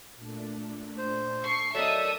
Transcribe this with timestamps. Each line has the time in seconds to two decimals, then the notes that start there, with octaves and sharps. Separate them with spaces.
0.16 A#2 A3 D4
0.98 C5
1.44 A4 C#6 C7
1.75 F#3 D4 D#4 A4 A#4 E5 A5 D#6